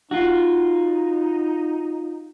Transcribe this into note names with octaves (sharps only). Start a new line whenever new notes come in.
D#4 F4 F#4